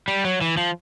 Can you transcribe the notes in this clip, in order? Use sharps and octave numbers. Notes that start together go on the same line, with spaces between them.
G3
F#3
E3
F3